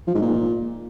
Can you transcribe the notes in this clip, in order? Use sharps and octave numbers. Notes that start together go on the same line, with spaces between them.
F3
G#2
A#2